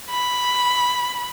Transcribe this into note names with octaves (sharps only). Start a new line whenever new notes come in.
B5